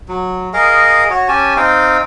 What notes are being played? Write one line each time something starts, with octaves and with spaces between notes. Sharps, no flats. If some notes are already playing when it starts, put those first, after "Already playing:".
F#3
G#4 A#4 D#5 F5
F#4 C#5
C#4 G4 G#5 A5
C4 D#4 F5 G5